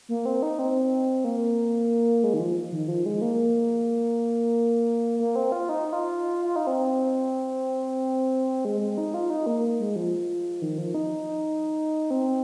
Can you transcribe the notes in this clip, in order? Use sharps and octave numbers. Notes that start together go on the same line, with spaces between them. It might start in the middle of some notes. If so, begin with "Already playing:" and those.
A#3
C4
D#4
C4
A#3
G#3
D#3
F3
D#3
F3
G#3
A#3
A#3
C4
F4
D#4
F4
F4
D#4
C4
G#3
G#3
D#4
F4
D#4
A#3
G#3
F3
D#3
F3
D#4
C4